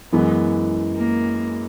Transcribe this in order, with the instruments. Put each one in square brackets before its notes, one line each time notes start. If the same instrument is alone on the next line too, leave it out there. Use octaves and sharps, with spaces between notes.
[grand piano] F#2 E3 G#3 [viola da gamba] B3
[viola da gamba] A#3